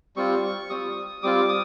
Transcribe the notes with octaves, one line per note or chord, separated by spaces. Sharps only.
G3 C4 F4 C#6
G3 C4 F4 D#6
G3 C4 F4 D6
D#6